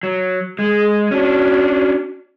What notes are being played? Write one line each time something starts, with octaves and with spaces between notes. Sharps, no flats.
F#3
G#3 G#4
C#4 D4 F#4